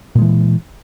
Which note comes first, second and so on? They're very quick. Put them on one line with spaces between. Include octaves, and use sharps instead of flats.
A#2 G#3 E3